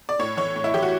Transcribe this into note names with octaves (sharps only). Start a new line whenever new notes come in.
D5
A2 C#5
E3 C#5
A2
E4
E3 G4
F#4